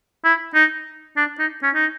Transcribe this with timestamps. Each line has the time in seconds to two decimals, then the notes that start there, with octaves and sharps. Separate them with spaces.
0.24 E4
0.55 D#4
1.17 D4
1.39 D#4
1.63 C#4
1.75 D#4